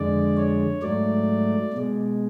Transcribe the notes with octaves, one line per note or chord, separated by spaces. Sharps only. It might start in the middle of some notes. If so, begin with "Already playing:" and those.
Already playing: F2 D3 G#3 D5
C#5
G#2 F#3 A3 D5
B2 G#3